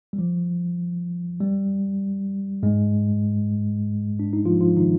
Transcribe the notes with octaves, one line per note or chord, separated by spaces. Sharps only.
G3
F3
G3
G#2 G#3
D4
D#4
F3 F4
F3 F4
D#3 D#4